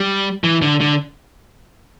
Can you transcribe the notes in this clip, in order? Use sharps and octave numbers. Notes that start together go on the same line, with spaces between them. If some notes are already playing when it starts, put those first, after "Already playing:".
Already playing: G3
E3
D3
D3